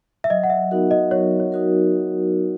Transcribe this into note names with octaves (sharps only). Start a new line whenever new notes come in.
E5
F#3 D#5
F#5
E5
B3 D#4 F#4 A#4
D#5
F#3 C#5
C#5
D#4 F#4 A#4